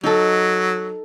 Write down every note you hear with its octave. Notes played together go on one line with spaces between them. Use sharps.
F#3 D#4 A4